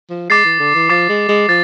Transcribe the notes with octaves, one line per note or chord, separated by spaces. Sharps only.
F3
G#3 D6 A6 C7
E3
D3
E3
F3 D6 A6 C7
G#3
G#3
F3 A6